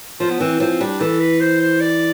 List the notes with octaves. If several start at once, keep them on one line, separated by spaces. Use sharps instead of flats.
F3 F4
B3
E3 C4
F3 C4
G3 D4
E3 A4
B4
C5
C5
D5